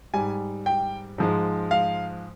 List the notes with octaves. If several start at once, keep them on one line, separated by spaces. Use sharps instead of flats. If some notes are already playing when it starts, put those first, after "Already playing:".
G#2 G3 G#5
G5
G#2 F3 G#3
F5